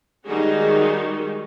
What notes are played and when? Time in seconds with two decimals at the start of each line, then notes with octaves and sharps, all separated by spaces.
0.25 D#3 G3 G#3 D#4 F#4 G#4